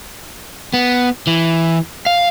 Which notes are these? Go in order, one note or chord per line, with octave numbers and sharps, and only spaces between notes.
B3
E3
F5